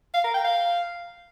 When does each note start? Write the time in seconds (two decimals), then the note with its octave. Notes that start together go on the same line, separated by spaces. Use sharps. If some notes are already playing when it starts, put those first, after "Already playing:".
0.14 F5
0.24 A#4
0.34 G5
0.44 F5